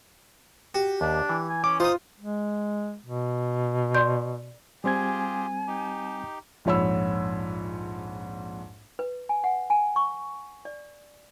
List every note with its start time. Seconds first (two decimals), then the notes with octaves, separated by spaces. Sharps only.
0.74 F#4 G4
1.01 D#2 D4
1.29 E3
1.49 G#5
1.64 C#4 D6
1.80 D#4 F4 C5 D#6
2.19 G#3
3.06 B2
3.95 D5 C6 G6
4.84 G3 C4 F4 G4 G#4 G#5 G#6
5.67 D#4 G4
6.65 A#1 F2 G#2 C#5 B5 E6
8.99 B4
9.29 G#5
9.44 F#5
9.70 G#5
9.96 C#6
10.65 D5